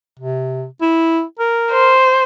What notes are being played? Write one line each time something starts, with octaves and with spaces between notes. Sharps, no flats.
C3
E4
A#4
C5